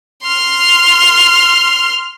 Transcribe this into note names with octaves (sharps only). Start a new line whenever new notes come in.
C6 F6